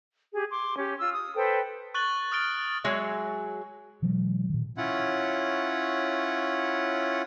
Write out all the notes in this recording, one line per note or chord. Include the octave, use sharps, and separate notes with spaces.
G4 G#4
C6 D6
C#4 G4
F4 E6
D#6
A4 B4 C5 G5
C#6 F#6 A6 F#7 G7
D#6 F6 A6 D7 G7
F#3 G#3 G#4 E5
B2 E3 F#3 G#3
A#2 D#3
C#4 E4 F4 C#5 F#5